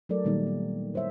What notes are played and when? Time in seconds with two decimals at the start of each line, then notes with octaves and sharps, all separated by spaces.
0.09 F#3 A3 A4 A#4 D5
0.25 A#2 D#3 G3 A#3 D#4
0.47 B3
0.94 G3 C5 C#5 E5